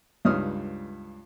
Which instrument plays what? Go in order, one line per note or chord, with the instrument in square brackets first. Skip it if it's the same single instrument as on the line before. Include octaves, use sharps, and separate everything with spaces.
[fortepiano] C#2 G2 D#4 C#5 D#6 F6